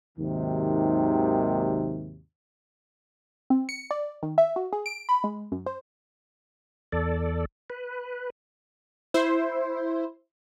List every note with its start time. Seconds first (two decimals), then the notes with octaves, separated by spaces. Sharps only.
0.18 D#2 G#2 C3 D#3 F#3
3.50 C4
3.69 C#7
3.91 D5
4.23 D#3
4.38 E5
4.56 F#4
4.73 G#4
4.86 D7
5.09 B5
5.24 G#3
5.52 F#2
5.66 C5
6.92 E2 A4 D5
7.70 B4
9.14 E4 C5